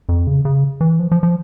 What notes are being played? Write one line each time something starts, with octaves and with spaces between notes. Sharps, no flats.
F2
C#3
C#3
E3
F3
F3
F3